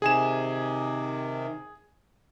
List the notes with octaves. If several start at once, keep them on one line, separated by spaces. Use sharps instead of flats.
C3 D#3 G#4 G#5 E7